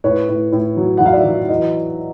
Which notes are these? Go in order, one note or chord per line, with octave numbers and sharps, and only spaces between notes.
A2 B4 C#5
A2
A2
F#3
F#5
F#3
F5
D5 E5
F#3
E3 D#5